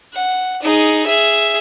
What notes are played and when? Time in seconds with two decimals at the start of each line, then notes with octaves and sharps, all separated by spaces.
0.13 F#5
0.62 D#4 G#4
1.06 G#4 E5